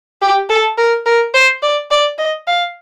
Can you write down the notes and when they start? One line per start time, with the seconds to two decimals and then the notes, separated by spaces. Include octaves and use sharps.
0.22 G4
0.49 A4
0.78 A#4
1.06 A#4
1.34 C5
1.63 D5
1.91 D5
2.18 D#5
2.47 F5